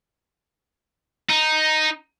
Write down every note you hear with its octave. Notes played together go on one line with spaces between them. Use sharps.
D#4